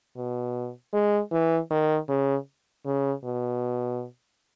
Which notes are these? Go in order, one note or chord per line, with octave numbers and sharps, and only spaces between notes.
B2
G#3
E3
D#3
C#3
C#3
B2